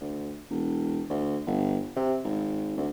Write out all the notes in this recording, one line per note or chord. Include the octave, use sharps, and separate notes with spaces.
D2
E1
D2
G1
C3
G#1
D2